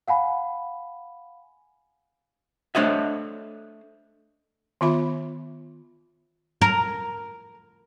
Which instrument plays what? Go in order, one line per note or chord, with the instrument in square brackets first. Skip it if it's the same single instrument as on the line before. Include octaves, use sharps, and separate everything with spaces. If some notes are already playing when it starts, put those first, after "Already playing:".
[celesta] F5 F#5 G#5 B5
[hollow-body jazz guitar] A3 D4 C5 C#5 D#5 E5
[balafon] D#3 B3 F4 E5 B5
[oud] A#4